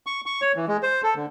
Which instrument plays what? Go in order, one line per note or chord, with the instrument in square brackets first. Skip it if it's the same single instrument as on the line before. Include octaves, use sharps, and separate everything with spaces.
[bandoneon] C#6
C#6
C#5
E3
G#3
C5
A4
D3